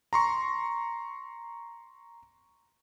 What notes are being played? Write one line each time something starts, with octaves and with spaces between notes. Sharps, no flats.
A#5 C6 C#6